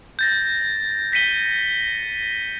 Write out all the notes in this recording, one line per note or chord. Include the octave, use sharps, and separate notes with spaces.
G6 A6 A#6
A#6 B6 C#7 D#7 G7